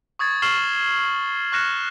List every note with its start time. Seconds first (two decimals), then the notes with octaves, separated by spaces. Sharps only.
0.19 C#6 D#6 G#6 A6
0.42 C#6 F6 C7 E7 F#7 G7
1.52 C#6 F6 F#6 A#6 C#7 E7